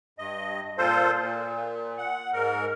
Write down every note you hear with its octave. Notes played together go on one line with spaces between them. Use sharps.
G2 D#5
A#2 F4 A4 C5
A#2
F#5
G#2 A#4